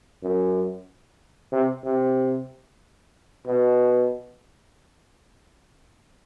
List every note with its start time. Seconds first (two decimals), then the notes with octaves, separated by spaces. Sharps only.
0.22 F#2
1.52 C3
1.84 C3
3.47 B2